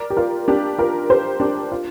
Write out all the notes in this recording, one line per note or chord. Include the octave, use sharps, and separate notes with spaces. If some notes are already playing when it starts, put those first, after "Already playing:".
Already playing: A#4 D5
G4
F4 A#4
D4 G4
F4 A#4
G4 C5
D4 G4
F4